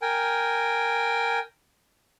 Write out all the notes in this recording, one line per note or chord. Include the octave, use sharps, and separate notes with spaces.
A#4 G5 G#5